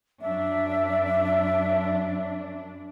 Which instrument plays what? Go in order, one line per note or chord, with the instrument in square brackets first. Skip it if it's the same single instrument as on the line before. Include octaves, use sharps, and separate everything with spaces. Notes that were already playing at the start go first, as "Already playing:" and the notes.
[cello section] F#2 D4 [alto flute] E5